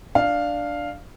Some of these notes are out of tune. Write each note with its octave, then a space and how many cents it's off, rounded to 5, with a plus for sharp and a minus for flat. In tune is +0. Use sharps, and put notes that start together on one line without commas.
D4 +0 F5 +0